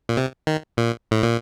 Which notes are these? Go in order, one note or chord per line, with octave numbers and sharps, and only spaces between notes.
A#2
C3
D#3
A#2
A2
A#2